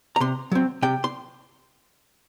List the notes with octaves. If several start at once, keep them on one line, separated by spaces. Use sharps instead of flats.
A#5
C3 C6
F#3 C4
C3 G5
C6